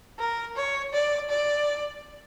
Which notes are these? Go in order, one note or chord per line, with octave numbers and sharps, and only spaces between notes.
A#4
C#5
D5
D5